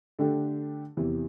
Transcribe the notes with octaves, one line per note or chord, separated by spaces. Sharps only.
D3 A3 D4 G4
E2 C3 E3